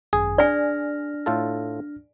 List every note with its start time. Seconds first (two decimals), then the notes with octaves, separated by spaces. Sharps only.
0.13 G#1 F#2 G#4
0.38 D4 D5 G#5 F6 A#6
1.26 A2 F4 A4